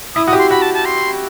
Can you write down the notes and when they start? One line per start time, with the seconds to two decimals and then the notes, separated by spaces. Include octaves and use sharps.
0.15 E4 D#6
0.27 F#4 D#6
0.33 G4
0.39 C6
0.50 F#4 B5
0.62 A5
0.74 A5
0.85 C6